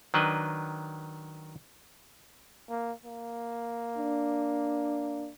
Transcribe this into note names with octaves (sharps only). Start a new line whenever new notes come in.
D#3 F#3 D4 B4 D#5
A#3
A#3
D4